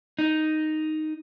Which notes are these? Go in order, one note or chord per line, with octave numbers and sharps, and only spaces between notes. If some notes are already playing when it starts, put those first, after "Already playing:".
D#4